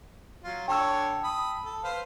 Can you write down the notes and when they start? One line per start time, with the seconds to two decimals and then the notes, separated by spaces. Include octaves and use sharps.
0.44 F#3 F4
0.68 D3 C#5 G5 A5 E6
1.24 B5 D#6
1.65 A4
1.84 B4 C5 F5